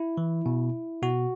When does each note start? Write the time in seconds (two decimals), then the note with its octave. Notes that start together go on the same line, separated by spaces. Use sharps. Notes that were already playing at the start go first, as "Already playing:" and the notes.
Already playing: E4
0.17 E3
0.46 B2
1.02 B2 F#4